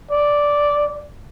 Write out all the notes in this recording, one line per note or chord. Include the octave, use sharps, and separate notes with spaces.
D5